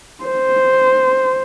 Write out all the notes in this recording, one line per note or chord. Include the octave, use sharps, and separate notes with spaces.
C5